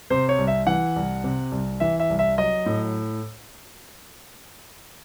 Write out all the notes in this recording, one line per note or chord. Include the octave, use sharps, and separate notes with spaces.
C3 C5
C#5
C2
E5
E3 F#5
C2
C3
C2
E3 E5
E5
C2
E5
F#3 D#5
A2